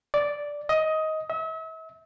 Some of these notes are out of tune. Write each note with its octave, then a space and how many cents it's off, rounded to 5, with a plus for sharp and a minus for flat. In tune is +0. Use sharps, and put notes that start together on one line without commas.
D5 -5
D#5 +15
E5 -40